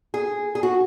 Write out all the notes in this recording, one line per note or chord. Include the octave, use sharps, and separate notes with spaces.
G#4
G#4
F#4